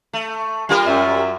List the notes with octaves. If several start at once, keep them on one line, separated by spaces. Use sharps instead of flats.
A3
G3 F4 A#4
F#2 E5